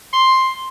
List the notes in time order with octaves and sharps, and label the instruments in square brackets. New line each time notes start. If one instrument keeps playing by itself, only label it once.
[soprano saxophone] C6